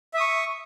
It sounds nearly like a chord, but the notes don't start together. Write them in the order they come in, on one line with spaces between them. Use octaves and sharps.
E5 D#6 C#6